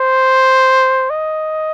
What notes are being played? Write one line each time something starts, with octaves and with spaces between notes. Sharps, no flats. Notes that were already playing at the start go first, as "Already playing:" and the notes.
Already playing: C5
D#5